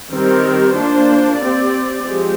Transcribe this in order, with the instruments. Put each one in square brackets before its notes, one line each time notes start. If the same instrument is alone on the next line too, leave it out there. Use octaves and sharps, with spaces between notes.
[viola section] D#3 G3 C4 G4 A#4
A#3 D4 F4 C5
C4 G4 D5
F3 G#3 C4 G4